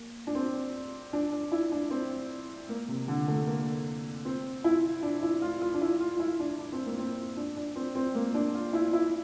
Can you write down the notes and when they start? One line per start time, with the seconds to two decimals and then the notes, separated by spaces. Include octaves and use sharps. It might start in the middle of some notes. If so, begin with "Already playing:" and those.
Already playing: A#3
0.27 D4
0.35 C4
1.13 D4
1.32 D4
1.52 E4
1.72 D4
1.90 C4
2.69 A#3
2.88 C3
3.08 D3
3.27 A3
3.47 A#3
4.25 C4
4.64 E4
5.03 D4
5.23 E4
5.42 F4
5.61 F4
5.74 D4
5.81 E4
6.00 F4
6.14 F4
6.20 E4
6.40 D4
6.59 D4
6.72 C4
6.86 A#3
6.99 C4
7.37 D4
7.57 D4
7.76 C4
7.95 C4
8.15 A#3
8.34 D4
8.55 F4
8.73 E4
8.93 E4